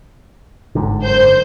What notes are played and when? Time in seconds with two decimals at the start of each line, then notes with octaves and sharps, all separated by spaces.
0.75 G1 G#2 D3
1.05 F#2 C5 G6